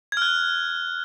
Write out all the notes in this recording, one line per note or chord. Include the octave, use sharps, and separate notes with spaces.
F6 F#6 G#6